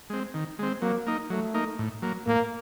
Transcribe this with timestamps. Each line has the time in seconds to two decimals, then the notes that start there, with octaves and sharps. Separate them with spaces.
0.10 G#3 C4
0.34 D#3
0.59 G#3 C4
0.82 F#3 A#3
1.07 A#3 D#4
1.30 F#3 A3
1.54 A#3 D#4
1.79 A2
2.02 F#3 A#3
2.26 A2 A#3